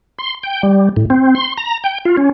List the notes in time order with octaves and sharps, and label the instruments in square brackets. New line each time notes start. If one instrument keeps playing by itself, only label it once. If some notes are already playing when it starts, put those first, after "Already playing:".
[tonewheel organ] C6
G5
G3
A2
C4
C6
A#5
G5
F4
C#4